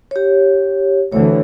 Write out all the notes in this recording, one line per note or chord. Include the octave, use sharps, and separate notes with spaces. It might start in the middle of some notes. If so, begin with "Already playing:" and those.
G4 C#5
D2 D3 E3 C#5